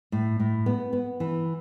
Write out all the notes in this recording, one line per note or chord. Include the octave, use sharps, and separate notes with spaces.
A2
A2
B3
B3
E3